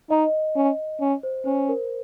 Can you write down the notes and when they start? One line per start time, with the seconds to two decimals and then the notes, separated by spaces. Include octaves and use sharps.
0.10 D#4 D#5
0.56 C#4
1.00 C#4
1.23 C5
1.45 C#4 C5
1.69 A#4